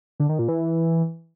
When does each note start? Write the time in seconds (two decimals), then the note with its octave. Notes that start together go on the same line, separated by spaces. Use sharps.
0.20 D3
0.29 D#3
0.39 A#2
0.48 E3